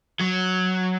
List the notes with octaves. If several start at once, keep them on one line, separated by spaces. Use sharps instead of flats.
F#3